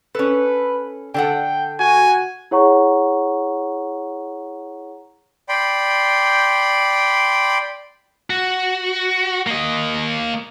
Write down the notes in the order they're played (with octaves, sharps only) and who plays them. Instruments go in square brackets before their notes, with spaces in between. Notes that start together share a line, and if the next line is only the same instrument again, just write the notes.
[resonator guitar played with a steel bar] C#4 A4 [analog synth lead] B4
[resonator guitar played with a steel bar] D3 A4 F#5 [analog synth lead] G5
[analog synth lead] F#4 [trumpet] G#5
[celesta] E4 G#4 C#5 F#5 A#5 C#6
[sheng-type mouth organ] D5 G5 B5 C6
[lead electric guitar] F#4
A#3 D#5